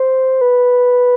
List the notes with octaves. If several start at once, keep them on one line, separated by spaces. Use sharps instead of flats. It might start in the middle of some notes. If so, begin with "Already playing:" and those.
Already playing: C5
B4